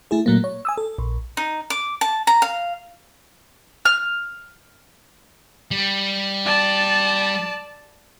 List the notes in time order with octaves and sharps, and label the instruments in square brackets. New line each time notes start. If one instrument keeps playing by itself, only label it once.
[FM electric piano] A3 E4 G#4
A#2 F#3 A3 A#3
C#5
G#5 D#6 E6
A4
A#1
[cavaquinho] D#4
D6
A5
A#5
F5
[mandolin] F6
[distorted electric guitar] G3
[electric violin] D5 A5